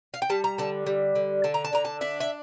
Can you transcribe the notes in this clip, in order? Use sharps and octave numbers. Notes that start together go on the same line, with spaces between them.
F5
G5
G3 A5
A#5
D3 A5
G3
D3
D3 A5
A#5
A5
D3 A#5
A5
D4 E5
E5